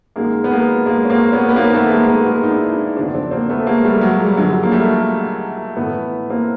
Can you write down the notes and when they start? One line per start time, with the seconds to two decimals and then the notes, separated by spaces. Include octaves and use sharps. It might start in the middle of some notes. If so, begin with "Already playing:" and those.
0.16 F#2 D#3 G#3 A#3
0.44 B3
0.51 G#3 A#3
0.86 G#3 A#3
1.05 C#4
1.09 A#3 C4
1.32 B3 C#4
1.49 B3
1.56 F#2 D#3 A#3 C4
1.73 A3 B3
1.91 G#3 A#3
2.08 A3 B3
2.26 G#3 A#3
2.43 D#4
2.49 D4 E4
2.72 D4 E4
2.96 E2 C#3 F3 C4 D4
3.14 C4 D4
3.31 A#3 C4
3.49 A3 B3
3.67 G#3 A#3
3.84 G3 A3
4.01 F#3 G#3
4.20 G3
4.36 F#2 D3 F3 F#3 G#3
4.63 A#3
4.72 G3 A3
5.77 A2 E3 A3 B3
6.30 A#3 C4